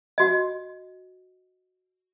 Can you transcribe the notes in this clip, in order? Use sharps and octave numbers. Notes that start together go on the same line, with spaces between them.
F#4 D#5